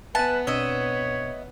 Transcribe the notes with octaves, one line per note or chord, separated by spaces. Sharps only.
B3 B4 E5 G#5 A5
B2 C4 D4 C#5 D#5 E5